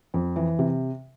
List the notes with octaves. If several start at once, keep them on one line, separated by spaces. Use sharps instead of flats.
F2
E3
C3